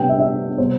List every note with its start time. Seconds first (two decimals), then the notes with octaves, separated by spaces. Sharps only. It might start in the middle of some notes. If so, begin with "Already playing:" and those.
Already playing: C3 G3 B3 G5
0.09 E5
0.19 E5
0.58 C3 G3 B3 C5